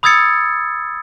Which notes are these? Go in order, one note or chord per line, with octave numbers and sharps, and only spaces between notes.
B5 D#6 E6 G#6 A6 C#7